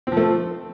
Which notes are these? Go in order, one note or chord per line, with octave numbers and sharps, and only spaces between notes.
F3 A3 C4